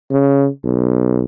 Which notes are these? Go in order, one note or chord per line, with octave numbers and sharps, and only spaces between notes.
C#3
B1